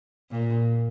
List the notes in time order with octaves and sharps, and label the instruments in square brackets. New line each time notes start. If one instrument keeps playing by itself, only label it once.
[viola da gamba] A#2